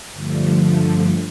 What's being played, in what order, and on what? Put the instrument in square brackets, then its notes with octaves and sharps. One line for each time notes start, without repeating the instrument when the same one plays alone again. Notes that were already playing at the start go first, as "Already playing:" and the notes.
[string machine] G2 D3 F3 A3